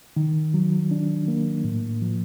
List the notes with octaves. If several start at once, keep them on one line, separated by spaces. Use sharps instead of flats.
D#3
F#3
D4
A#3
A2
F3